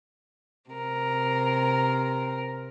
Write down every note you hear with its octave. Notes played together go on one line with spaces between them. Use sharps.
C3 A#4